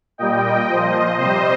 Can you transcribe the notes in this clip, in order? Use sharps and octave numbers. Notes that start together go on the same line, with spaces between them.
A#2 G3 D#5 G5
A#2 F3 C5 D#5
C3 G3 C5 D#5